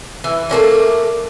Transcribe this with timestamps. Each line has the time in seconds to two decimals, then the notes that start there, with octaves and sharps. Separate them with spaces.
0.24 E3
0.49 A3 A#3 C#4 D4